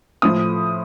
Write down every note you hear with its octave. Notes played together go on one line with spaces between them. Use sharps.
A2 F3 D#6